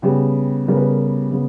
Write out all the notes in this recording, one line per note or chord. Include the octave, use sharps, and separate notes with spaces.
C#3 G3 B3 G4
C#3 G3 B3 A#4
B4
A#4
C#3 G3 B3